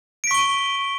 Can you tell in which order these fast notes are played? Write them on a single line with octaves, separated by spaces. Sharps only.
D7 B6 C#6 G7 D#7